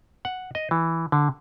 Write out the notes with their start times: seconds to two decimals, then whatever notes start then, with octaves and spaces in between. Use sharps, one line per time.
0.25 F#5
0.55 D#5
0.71 E3
1.12 D3